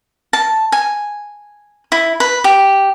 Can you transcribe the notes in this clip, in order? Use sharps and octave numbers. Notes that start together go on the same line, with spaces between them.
A5
G#5
E4
B4
G4